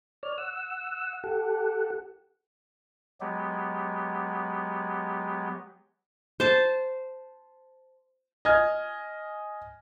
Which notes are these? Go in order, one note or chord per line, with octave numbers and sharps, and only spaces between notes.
C#5 D5 F6
F#5 E6
G4 A4 F#5
F#3 G#3 B3 G4
C5 A5
D#5 G#5 F6 G#6